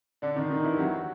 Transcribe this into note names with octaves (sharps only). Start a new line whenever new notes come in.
D3 D4
D#3 D#4
D#3 D#4
E3 E4
G4
F#3 F#4